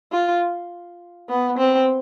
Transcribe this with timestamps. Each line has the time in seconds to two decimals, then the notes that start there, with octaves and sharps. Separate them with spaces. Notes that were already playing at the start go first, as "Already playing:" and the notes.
0.12 F4
1.29 B3
1.58 C4